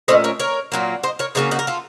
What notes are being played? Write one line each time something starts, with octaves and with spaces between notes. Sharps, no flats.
A#2 A3 C#4 C5 D#5
A#4 C#5
A#4 C#5
A#2 F#3 A#3
C5 D#5
A#4 C#5
C#3 F#3 A#3 C#4 D#4
D#4 F#4
A#4
F4 A4